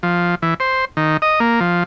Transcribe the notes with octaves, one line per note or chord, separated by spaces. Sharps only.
F3
E3
C5
D#3
D#5
A#3
F3